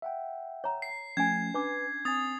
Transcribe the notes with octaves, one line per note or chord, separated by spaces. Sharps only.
E5 F#5 G5
C#5 A#5
C7
F3 A3 C#4 G#5 G#6
D4 B4 D6
C4 G#5 D#6 A6